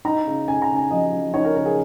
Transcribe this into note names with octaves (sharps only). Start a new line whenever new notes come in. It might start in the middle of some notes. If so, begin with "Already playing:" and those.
D#4 A#5
C#3
C#3 G#5
A#5
D#4
G#5
F3 D#5
F3
D#4 C#5
A#4
C#3 A#4
G#4